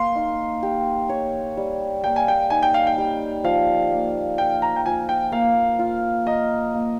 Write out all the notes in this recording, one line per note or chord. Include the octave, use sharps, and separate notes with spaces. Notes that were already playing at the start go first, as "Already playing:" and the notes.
Already playing: A#3 C6
D#4
G4
C#5
G3
A#3 G5
G#5
G5
D#4 G#5
G5
F5
G5
G3
F3 F5
A#3
F4 G5
A#5
G5
F3 G#5
G5
A#3 F5
F4
A#4 D#5
A#3